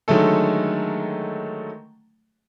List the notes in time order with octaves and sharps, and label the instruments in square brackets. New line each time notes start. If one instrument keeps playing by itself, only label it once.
[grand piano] D3 D#3 F#3 G#3 A3 A4